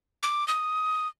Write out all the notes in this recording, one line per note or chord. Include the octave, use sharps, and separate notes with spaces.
D6
D#6